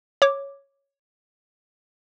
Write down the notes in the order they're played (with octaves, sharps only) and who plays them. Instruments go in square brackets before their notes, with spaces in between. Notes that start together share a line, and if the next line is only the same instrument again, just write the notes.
[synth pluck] C#5 D6